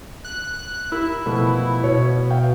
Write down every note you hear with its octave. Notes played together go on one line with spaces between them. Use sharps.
F#6
E4 G4 A#4
B2 F3 A3
B2 C#5
E5 F5 G5